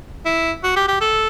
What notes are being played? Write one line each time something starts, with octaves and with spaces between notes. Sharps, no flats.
E4
F#4
G4
G4
A4